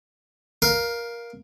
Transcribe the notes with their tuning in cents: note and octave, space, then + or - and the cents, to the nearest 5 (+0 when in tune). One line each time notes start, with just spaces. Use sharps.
A#4 +15 F5 +0